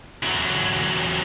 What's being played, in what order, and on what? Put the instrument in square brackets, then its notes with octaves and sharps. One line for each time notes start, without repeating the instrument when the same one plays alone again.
[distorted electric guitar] E2 F#3